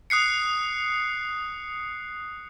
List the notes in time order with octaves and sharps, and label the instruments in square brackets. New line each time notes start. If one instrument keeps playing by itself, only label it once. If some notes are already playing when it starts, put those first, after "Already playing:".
[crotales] D#6 F#6 C7 C#7